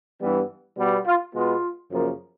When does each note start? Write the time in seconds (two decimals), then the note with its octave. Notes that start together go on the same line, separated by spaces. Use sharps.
0.22 G2 E3 G3 B3
0.78 B2 G3 B3
1.06 F4
1.34 B2 G#3 B3 F4
1.91 F#2 C#3 F3 A#3